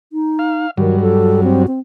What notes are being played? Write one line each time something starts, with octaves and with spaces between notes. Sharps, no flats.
D#4
F5
G2 D#3 F#3
A4
C4
C4